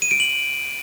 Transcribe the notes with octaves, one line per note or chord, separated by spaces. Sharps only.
D#7
D7
F#7